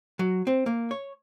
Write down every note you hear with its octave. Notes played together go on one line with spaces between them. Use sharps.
F#3
C4
A#3
C#5